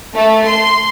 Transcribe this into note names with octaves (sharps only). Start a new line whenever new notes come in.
A3
C6